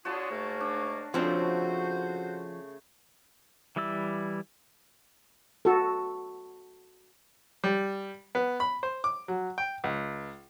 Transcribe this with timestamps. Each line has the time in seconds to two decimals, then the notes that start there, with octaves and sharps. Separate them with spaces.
0.05 D3 F4 F#4 G#4 C#5 A5
0.29 G#2 A3 A#3
0.61 D4
1.14 C#3 F3 A3 C4 D4 F#4 C5
3.76 E3 G3 E4 D5 E6
5.65 F#4 A4
7.64 G3
8.35 B3
8.60 B5
8.83 C5
9.04 D6
9.28 F#3
9.58 G5
9.84 C#2